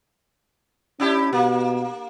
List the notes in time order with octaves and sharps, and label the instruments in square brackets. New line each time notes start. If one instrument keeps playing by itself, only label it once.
[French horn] C#4 [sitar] D4 E4 G4
[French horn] B2 [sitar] A#3